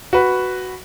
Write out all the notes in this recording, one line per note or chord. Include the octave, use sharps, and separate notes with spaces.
F#4 B4